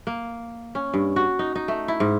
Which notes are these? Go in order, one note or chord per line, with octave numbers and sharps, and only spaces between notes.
A#3
C#4
G2
F#4
D#4
D#4
A3
E4
G#2